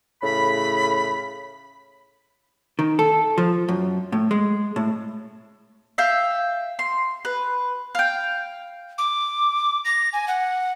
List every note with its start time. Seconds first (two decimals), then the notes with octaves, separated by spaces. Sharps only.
0.23 A2 C#3 B5
2.79 D#3
2.99 A4
3.38 F3
3.68 F#2
4.12 A2
4.31 G#3
4.76 A2
5.98 E5 F5 G5
6.79 C6
7.25 B4
7.95 F5 G5
8.98 D6
9.85 A#6
10.13 G#5
10.28 F#5